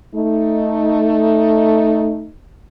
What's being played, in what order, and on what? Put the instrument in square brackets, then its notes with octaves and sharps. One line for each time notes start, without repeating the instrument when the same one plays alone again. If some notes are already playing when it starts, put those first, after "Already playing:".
[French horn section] A3 D#4